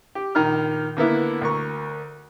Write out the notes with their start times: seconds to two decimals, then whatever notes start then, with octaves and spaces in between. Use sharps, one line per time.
0.15 G4
0.35 A#1 D#3 A#5 F6
0.97 D3 A#3 B3 E4
1.41 D2 A#4 C#6